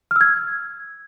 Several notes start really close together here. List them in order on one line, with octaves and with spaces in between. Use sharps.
F6 E6 G#6